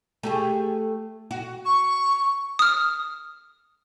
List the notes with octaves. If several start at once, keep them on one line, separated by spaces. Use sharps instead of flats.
A3 G4 G#4
F#4
C#6
D#6 F6